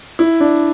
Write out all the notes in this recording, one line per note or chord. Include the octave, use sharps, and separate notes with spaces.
E4
D4